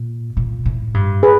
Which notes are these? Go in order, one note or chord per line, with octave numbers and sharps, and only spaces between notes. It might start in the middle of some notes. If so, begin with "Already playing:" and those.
Already playing: A#2
A#2
A2
G2
G#4 B4